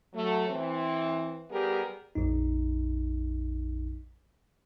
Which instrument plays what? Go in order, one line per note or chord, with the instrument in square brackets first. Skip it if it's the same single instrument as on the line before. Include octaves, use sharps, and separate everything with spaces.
[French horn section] F#3 A3
E3 C4
G3 B3 G4 G#4 A#4
[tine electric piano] A#1 F2 D#4